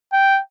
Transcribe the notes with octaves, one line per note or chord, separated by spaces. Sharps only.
G5